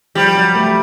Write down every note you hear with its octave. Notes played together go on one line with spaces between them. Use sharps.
F3 G3
F#3
A3